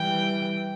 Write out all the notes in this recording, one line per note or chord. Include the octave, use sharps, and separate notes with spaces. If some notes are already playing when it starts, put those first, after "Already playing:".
Already playing: E3 G3 G5